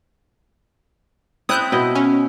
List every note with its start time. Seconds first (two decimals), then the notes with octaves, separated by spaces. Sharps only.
1.49 C4 E4 E5 D#6 F#6 G6
1.72 B2 E4 D#5
1.95 C#4